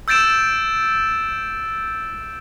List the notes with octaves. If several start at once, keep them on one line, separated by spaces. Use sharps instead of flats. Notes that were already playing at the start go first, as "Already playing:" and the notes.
E6 G6 A6 D7 E7